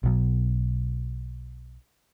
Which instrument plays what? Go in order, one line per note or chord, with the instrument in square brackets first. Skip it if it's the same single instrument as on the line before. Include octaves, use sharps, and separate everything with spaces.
[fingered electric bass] B1 B2 F#3